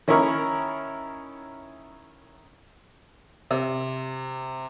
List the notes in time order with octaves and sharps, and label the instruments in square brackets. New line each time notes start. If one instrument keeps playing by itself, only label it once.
[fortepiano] D#3 C#4 E4 A#4 C#6 F6
[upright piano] C3